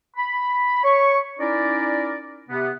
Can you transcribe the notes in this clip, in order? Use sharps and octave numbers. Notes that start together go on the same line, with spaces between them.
B5
C#5 C#6
C#4 D#4 E4 A#4 D5
C3 B3